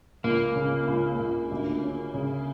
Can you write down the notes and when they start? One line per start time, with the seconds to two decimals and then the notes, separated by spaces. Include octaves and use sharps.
0.24 C#2 A#3
0.55 C#3
0.88 C#2
1.19 C#2
1.51 D2
1.83 C#4
2.14 C#3